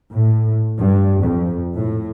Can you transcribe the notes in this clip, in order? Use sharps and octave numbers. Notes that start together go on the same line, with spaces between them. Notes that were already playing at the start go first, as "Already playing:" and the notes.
A2
G2
F2
A2